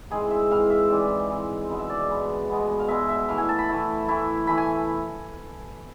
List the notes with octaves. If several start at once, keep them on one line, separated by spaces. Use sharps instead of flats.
G#2 E3 G#3 C4 G#4
E5
G#2 E3 G#3 C4 F5
E5
G#2 E3 G#3 C4 D5
G#2 E3 G#3 C4
B2 G#3 B3
E5
D5
B2 G#3 B3
B2 G#3 B3
F5
B2 G#3 B3 E5
E5
E3 A3 E4 F5
G#5
A5
B5
E3 A3 E4
E3 A3 E4
E3 A3 E4 B5
G#5